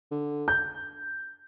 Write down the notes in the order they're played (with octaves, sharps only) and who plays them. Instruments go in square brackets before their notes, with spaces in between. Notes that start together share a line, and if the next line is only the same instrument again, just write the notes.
[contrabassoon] D3
[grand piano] G6